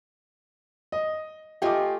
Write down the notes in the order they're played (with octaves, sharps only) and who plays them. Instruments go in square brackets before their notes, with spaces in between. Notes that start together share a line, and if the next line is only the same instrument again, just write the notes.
[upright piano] D#5
[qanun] A3 F4 G#5 [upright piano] G4 D#5 D6